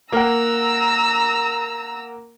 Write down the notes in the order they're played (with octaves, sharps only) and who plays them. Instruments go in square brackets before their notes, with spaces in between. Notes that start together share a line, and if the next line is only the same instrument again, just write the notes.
[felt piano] A#3 A#4 F#5 [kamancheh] A#5 E6